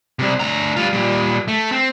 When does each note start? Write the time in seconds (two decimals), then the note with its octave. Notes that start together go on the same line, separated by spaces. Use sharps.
0.19 C3 G3
0.40 D2 A#5
0.76 G3 F4
0.93 A#2 G3
1.48 A3
1.72 C4